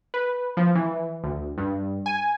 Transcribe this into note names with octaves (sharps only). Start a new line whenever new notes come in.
B4
F3
E3
D2
G2
G#5